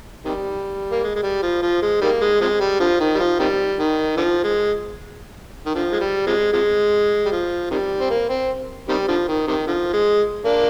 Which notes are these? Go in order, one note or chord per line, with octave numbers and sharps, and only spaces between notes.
C3 D#3 G3
A#3
G#3
G#3
G3
F3
F3
G#3
D#3 G3 A#3
G#3
C3 F3 G#3
G3
D3 F3
D#3
G3
F3
C3 D#3 G3
D#3
D3 F3
G#3
D#3
D3 F3
G#3
G3
C3 F3 G#3
C3 F3 G#3
G3
F3
C3 D#3 G3
C4
A#3
C4
C3 D#3 G3
D3 F3
D#3
C3 D#3
D3 F3
G#3
A#3 D4